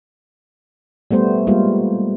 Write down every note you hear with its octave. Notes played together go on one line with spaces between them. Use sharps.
G3 A3 B3 C5
G3 G#3 A#3 F4